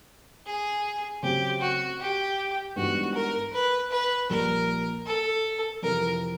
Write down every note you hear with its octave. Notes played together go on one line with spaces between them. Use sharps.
G#4
C#3 F#3 A3 C4 G4
F#4
G4
G#2 E3 G3 B3 D4 F#4
A#4
B4
B4
A#1 A#2 G3 A#3 A#4
A4
F2 C3 E3 A#4